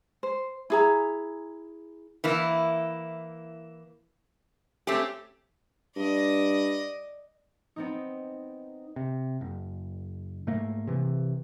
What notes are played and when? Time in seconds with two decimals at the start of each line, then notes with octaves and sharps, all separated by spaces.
0.23 C5
0.70 E4 G#4 A#5
2.24 E3 A#3 E4
4.87 A3 C4 C#4 G4
5.96 G2 D5 D#5
7.76 B3 C4 D#4
8.96 C3
9.41 F#1
10.47 G#2 A3 A#3
10.87 C3 E3